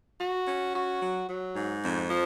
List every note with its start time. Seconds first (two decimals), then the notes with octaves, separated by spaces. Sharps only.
0.19 F#4
0.47 C#4
0.74 F#4
1.01 F#3
1.28 F#3
1.56 G#2
1.82 F2
2.10 F3